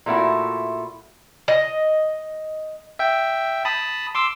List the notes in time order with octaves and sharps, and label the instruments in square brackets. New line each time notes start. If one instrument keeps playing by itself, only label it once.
[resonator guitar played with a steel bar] A#2 A3 E4 F#4
[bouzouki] D#5
[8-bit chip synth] E5 G5
A5 B5 D#6
C6 D6 E6